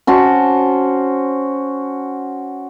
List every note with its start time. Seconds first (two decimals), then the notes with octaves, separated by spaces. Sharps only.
0.07 C#4 F#4 C5 A5